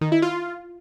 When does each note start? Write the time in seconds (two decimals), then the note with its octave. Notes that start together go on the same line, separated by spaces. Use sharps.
0.01 D#3
0.12 E4
0.22 F4